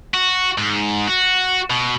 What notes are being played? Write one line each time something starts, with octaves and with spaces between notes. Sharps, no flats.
F#4
G#2
F#4
B2